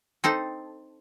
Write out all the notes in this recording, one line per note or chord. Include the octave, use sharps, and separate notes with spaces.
C4 D#4 A4